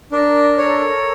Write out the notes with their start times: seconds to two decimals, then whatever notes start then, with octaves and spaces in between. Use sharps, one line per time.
0.12 D4 A#4
0.57 A4 C#5